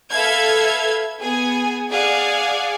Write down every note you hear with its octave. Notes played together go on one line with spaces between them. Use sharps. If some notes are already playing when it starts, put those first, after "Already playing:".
A4 B4 E5 F5 F6 G#6
B3 G#4 G#5
G#4 D5 F5 F#5 G#5